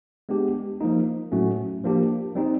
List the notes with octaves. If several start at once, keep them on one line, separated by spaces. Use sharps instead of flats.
G#3 B3 D4 G4
F3 A#3 D#4
A2 F#3 A3 C#4 F#4
F3 A#3 D4 G4
G3 C4 D#4